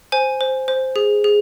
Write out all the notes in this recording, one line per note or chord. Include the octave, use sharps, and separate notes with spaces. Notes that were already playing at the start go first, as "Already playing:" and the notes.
C5 G#5
C5
C5
G#4
G#4